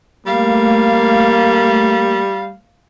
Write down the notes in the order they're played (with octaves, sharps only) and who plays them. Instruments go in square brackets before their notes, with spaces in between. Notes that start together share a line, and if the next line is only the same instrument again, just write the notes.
[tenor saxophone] G3 [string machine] A3 [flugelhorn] A#3 [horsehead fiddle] F5